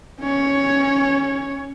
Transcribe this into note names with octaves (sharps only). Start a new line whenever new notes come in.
C#4 C#5